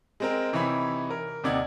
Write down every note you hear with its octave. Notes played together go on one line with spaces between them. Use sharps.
G#3 C4 A#4
C3 E3 D#4 C#5 E5 B5
A#4
D#2 C3 D#4 D5 F#5 G#6